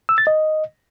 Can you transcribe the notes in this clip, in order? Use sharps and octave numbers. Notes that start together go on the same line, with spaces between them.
E6
A6
D#5